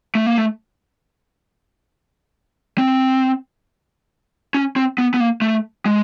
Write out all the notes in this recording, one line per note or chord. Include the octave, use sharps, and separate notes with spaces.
A3
A#3
A3
C4
C#4
C4
B3
B3
A#3
A3
G#3